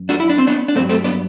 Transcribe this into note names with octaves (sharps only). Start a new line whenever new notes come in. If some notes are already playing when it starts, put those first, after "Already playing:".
Already playing: F#2
D4 F#4
E4
D4
C4
B3 D4
D4
G2 A3 C4
F#3
A3 C4
B3 D4